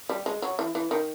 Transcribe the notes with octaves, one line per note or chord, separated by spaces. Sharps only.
G3
G#3
F#3
E3
E3
D#3